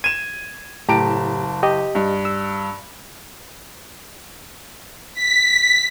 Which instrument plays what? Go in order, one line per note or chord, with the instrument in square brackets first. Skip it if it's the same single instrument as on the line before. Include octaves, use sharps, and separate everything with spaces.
[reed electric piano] G#6 [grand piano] D#7 E7
[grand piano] F#1 A5 D7 [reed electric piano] A2 G4 A#5
[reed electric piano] G4 D#5
[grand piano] G2
[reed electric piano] E6
[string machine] B6